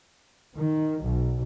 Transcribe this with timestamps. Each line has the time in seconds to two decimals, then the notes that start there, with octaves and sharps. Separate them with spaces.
0.56 D#3
1.03 B1